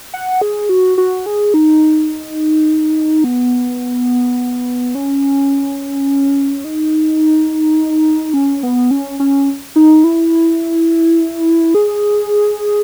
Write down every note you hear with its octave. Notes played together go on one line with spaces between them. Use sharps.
F#5
G#4
F#4
F#4
G#4
D#4
B3
C#4
D#4
C#4
B3
C#4
C#4
D#4
E4
G#4